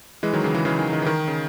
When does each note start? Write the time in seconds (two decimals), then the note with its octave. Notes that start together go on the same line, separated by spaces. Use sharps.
0.23 E3 G#3
0.33 D#3 F#3
0.44 C#3 E3
0.54 C#3 E3
0.65 C#3 E3
0.79 D#3
0.93 D#3
1.02 E3
1.06 D#3
1.28 C#3